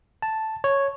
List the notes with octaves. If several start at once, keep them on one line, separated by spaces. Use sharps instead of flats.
A5
C#5